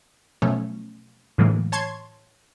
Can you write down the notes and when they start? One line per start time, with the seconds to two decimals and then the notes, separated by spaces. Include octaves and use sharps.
0.42 B2 F3 F#3 A3 C#4
1.38 A2 D3 E3 F#3 G#3 A#3
1.72 C#5 A5 C6 C#6 G#6